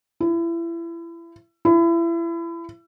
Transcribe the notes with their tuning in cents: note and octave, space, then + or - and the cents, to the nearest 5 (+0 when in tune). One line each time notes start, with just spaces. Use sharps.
E4 +30
E4 +30